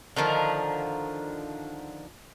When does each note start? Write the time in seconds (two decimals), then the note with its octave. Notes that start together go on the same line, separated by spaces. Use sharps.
0.16 D3 D#3 F3 A#4